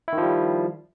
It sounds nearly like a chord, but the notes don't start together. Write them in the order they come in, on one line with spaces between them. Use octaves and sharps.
E4 D#3 F3 G3